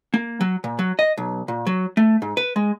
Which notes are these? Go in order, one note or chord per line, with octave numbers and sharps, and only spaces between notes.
A#3
F#3
A#2
F#3
D#5
B1
A#2
F#3
A3
G#2
B4
G#3